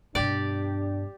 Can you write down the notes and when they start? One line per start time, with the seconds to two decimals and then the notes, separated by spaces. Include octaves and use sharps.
0.15 G2 B2 D4 G4 D5